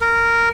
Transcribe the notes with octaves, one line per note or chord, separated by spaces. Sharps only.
A#4